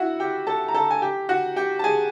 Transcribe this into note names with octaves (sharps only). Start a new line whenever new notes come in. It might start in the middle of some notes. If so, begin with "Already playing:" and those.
Already playing: E4 F#4 E5 F#5
G4 G5
A4 A5
A#5
A4 A5
G#5
G4 G5
F#4 F#5
G4 G5
A5
G#4 G#5